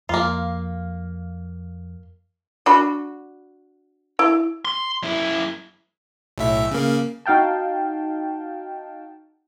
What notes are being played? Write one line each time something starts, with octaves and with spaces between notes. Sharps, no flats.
F2 A#3 F4
D4 F#4 B5
E4
C6
F#2 E4
B1 A2 E5
C#3 A#3
D#4 F#4 F5 G5 A5